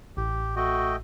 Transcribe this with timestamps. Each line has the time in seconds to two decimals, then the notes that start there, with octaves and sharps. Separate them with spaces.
0.17 A1 G4
0.56 A3 F#4 D#5 G5